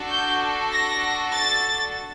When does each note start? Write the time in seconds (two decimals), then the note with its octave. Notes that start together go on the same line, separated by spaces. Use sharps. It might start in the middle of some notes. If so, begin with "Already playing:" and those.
Already playing: D4 F#4 A4
0.11 G6
0.72 A#6
1.32 A6